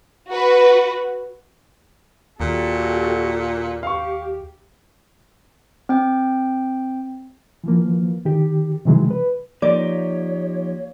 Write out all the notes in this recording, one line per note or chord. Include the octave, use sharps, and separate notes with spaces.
F#4 B4
D#2 A#2 F#4 G4 A4
G4 F5 C#6
C4 G5
E3 F3 A#3
D#3 G4
C3 D#3 E3 F#3 G#3
B4
F3 A#3 D#4 G4 C#5 D5